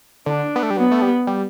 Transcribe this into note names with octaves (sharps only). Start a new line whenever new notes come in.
D3 D4
B3
A3
G3
F#3 B3
A3
G3
G3